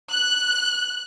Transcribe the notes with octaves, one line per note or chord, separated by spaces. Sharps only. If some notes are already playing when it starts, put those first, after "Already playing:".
F#6